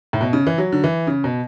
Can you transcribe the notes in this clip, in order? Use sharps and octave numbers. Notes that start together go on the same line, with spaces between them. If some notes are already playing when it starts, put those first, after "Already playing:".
A2
B2
C#3
E3
F#3
D3
E3
C#3
B2